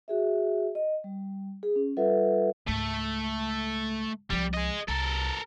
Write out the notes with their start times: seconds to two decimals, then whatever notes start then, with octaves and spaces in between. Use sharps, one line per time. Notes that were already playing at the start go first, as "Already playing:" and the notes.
0.08 F#4 G#4 E5
0.75 D#5
1.04 G3
1.63 G#4
1.76 C#4
1.97 G3 F4 A4 B4 E5 F#5
2.68 C#2 G#2 A3
4.30 C2 F3 G3
4.54 G#4 D#5
4.88 C2 A4 A#4